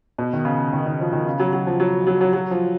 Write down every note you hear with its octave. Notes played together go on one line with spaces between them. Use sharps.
B2
D#3
C#3
D#3
D#3
F3
D#3
C#3
F#3
F#3
F3
F#3
F#3
F#3
F#3
F3